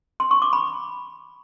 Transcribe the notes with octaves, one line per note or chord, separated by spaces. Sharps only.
C6
C#6
D6
B5